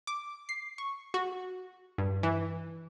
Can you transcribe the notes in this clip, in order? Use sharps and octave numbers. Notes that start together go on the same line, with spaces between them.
D6
C7
C#6
F#4
G2
E3